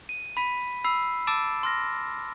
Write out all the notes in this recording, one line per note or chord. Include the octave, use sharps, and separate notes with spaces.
D#7
B5 B6 D#7
B5 E6 C7
A5 D6 E6 A6 D7 E7
C6 F6 A#6